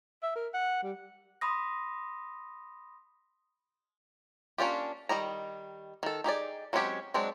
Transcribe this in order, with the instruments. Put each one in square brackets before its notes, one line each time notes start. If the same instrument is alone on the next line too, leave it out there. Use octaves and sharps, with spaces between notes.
[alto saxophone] E5
A#4
F#5
G3
[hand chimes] B5 C6 D#6 A#6
[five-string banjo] A#3 C#4 D4 F4 G4
D#3 G3 D#5 A#5
D#3 A4
D#4 G4 G#4 D5
F#3 G#3 C4 C#4 G4
F#3 G#3 C4 D4